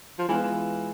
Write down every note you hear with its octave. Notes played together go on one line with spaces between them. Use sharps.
F3
E3 G#3 B3 F4 B4 F5
E3